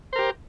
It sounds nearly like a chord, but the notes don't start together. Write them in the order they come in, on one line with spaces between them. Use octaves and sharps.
C5 A#4 G4